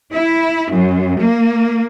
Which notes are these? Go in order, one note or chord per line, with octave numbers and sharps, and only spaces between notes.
E4
F#2
A#3